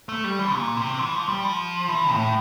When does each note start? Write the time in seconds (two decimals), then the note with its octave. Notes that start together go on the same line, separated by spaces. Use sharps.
0.09 A3
0.24 G3
0.39 E3
0.54 A#2
0.77 C3
0.99 E3
1.14 F3
1.28 G3
1.44 F3
1.88 E3
2.11 A2